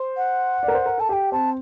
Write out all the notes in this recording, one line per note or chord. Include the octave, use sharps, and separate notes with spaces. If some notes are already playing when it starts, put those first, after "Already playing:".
Already playing: C5
F#5
D5
A#4
C5
A#4
A4 A5
G4 G5 A5
C4 A5